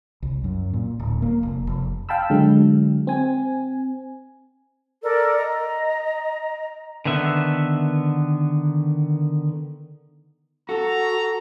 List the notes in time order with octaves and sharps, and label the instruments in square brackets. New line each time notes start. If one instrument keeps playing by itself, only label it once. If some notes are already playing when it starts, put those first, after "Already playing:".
[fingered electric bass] C2
F#2
A#2
D1
A#3
F1
F1
[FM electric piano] F5 G5 A5 B5 E6
D3 F#3 G#3
C4 G#5
[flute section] A4 A#4 D5
D#5 A#5
[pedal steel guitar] D3 D#3 B3 E5
[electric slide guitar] F#4 [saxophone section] A4 [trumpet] A#5